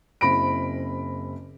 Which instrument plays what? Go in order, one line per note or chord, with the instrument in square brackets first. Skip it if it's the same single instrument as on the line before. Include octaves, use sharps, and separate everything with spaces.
[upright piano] F#1 C4 E4 B5 A#6 D7